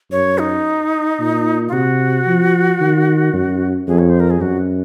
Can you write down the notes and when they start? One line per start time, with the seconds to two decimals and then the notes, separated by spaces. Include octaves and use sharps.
0.11 F#2 C#5
0.39 D#4
1.20 A#2
1.69 F4
1.72 C3 F#4
2.27 F3
2.81 D#3
3.34 F#2
3.88 F2 G#4
3.99 C#5
4.10 C5
4.20 A#4
4.30 G#4
4.41 F#2 F#4